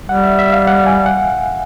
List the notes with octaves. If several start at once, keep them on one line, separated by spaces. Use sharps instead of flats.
G3 F#5
E5
E5
F5
F#5
G#5
F#5